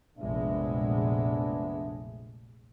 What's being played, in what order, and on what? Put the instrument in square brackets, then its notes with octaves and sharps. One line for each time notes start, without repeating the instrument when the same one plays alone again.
[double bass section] F1 A#1 G#3 [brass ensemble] B3 D4 E5